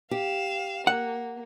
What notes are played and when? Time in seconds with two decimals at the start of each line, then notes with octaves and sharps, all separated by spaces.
0.11 G4 F5 E7
0.87 A#3 F#5